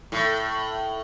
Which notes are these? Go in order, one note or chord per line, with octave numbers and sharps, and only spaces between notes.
A2